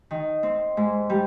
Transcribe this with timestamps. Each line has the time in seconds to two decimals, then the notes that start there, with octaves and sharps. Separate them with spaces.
0.11 D#3
0.43 C4
0.77 G#2
1.10 G3